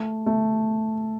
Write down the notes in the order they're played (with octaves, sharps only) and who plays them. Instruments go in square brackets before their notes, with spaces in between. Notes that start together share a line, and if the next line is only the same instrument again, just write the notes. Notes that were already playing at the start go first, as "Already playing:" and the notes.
Already playing: [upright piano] A3
A3